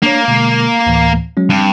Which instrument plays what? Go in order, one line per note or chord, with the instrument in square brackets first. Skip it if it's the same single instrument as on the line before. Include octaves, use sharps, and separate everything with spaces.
[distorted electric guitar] A#3 [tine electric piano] D4 C#5
[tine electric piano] B2 D3 G#3
D2 A2 E3
F#3 G#3 C#4
[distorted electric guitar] G2 [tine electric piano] C4